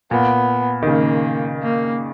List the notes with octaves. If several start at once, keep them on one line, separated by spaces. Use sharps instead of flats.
A#2 B3
D#3
C#3 A#3
A#3